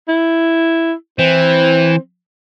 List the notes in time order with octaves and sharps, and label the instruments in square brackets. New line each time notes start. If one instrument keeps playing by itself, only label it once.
[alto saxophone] E4
[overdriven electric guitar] E3 [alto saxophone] C4